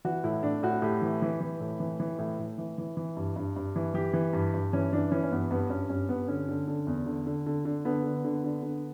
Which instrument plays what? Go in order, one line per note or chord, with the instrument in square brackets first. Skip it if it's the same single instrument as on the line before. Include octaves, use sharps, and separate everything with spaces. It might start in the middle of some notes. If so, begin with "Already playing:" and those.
[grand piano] E3 F#4
A2 E4
A2 D4
A2 F#4
A2 G4
E3
E3
E3
A2
E3
E3
A2
A2
E3
E3
E3
G2
G2
G2
E3
E3 G4
E3
G2
G2
E3 C#4
E3 D4
E3 C#4
C#4
G2 B3
G2 B3
G2 C#4
G2 C#4
G2 B3
D3 C#4
D3
D3
E2
D3
D3
D3
D3
D3 B3
D3
D3
D3
D3